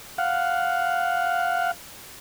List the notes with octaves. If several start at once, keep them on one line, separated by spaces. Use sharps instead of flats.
F5 F#5